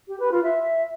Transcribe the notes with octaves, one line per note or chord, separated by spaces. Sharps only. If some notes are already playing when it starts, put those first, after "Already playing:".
G4
B4
F4
E5